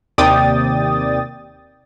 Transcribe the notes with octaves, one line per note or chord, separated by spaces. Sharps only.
D#2 C3 D5 G5 D#6 A6